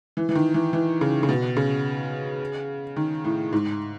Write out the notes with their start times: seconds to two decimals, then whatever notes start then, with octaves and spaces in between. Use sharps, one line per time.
0.17 E3
0.29 E3
0.35 D#3
0.54 E3
0.73 E3
1.01 C#3
1.23 C#3
1.29 B2
1.57 C#3
2.96 D#3
3.24 A2
3.53 G#2